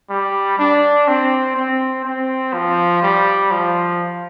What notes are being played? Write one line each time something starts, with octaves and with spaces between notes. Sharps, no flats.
G3
D4
C4
C4
C4
F3
G3
F3